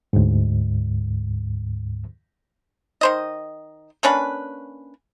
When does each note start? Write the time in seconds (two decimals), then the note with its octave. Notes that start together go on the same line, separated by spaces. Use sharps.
0.13 D2 G#2
3.01 D#3 C5 D#5
4.03 A#3 C#4 D4 B4